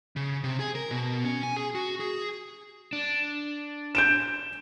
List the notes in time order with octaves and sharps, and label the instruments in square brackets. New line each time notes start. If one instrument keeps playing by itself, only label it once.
[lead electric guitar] C#3
C3
G#4
A#4
B2
C#4
G#5
G#4
F#4
G#4
[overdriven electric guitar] D4
[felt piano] G6 D7 E7